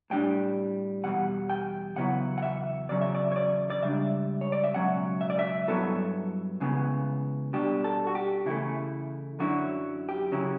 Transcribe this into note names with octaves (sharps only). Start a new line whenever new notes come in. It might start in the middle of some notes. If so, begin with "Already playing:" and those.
A2 G3 D4 G5
E2 B2 G3 F#5
G5
E2 C#3 F#3 B3 E4 F#5
F#5
E5
E2 C#3 F#3 C#4 D5
E5
D5
C#5
D5
D5
C#2 C#3 G3 D4 E5
C#5
D5
E5
C#2 B2 F#3 C#4 F#5
E5
D5
E5
G2 D3 F#3 B3 E4 A4
C#2 C#3 E3 B3
B2 G3 D4 G4
A4
F#4
G4
C#3 E3 A3 E4
F#2 D3 F#3 C#4 E4 F#4
G4
C#3 F#3 C#4 E4